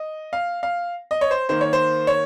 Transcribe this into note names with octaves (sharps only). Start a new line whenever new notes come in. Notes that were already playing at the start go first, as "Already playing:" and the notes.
Already playing: D#5
F5
F5
D#5
C#5
C5
D#3 A#3 C5
C#5
C5
C#5